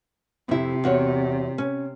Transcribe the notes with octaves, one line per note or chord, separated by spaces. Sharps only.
F2 C3 E4
E2 F#4 C#5
C#4